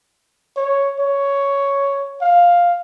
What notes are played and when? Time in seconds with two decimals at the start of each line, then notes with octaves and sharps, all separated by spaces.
0.56 C#5
0.99 C#5
2.21 F5